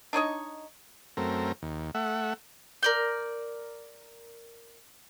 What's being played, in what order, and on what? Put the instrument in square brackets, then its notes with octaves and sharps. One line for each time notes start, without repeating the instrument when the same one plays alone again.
[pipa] D4 D#4 C#5 D#5
[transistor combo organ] F#2 A3 C4 A#4
D#2
A3 E5 F#5
[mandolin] A#4 D5 G6